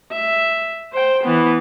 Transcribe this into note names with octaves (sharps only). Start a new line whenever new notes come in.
E5
C5 G5
E3 B3